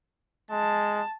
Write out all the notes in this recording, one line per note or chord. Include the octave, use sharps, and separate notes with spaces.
G#3 A5